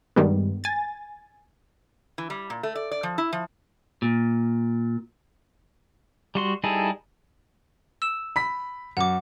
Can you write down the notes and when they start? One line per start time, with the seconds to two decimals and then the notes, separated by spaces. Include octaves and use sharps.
0.16 G2 D#3 G3 G#3 B3
0.64 G#5 A6
2.18 E3
2.30 G3
2.50 A#2
2.63 A3
2.75 D5
2.91 D5
3.03 F3
3.18 E4
3.32 F3
4.02 A#2
6.35 G3 F#4 C6
6.64 G3 D#4 E4 G#4 A4
8.02 E6 E7
8.36 B5 B6
8.97 F#2 F#5 D6